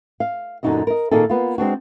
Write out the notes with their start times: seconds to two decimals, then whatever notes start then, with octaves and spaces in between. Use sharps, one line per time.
0.20 F5
0.63 F#2 A#2 D3 D#4 F#4 D#5
0.87 A#4 D#5
1.11 A#2 D#3 A#3 D#4 G#4 A4
1.29 A#3 B3 F4
1.58 G#3 C4 D4 F#4